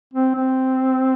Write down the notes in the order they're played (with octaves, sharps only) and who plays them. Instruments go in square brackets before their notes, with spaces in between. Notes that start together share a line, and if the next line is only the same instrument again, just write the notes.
[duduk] C4
C4